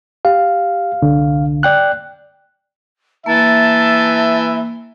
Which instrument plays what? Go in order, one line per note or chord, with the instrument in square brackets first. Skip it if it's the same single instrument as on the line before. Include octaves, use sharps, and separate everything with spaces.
[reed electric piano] G4 [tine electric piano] F5
[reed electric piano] C2 D3
D5 G5 F#6
[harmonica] E3 [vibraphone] A#3 [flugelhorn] E5 [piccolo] A5